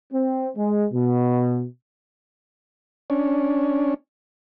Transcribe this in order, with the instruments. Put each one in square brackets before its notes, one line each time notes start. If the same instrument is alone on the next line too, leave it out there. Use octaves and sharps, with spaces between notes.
[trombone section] C4
G#3
B2
[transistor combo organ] C#4 D4